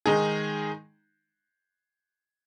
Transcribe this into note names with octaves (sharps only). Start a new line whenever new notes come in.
D#3 G#3 D#4 G#4